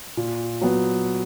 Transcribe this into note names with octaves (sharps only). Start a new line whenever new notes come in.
A#2
F#3 B3